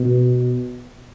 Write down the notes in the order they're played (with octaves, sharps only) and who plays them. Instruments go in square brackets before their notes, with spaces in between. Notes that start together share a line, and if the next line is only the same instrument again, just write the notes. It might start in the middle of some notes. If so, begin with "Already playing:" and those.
Already playing: [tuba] B2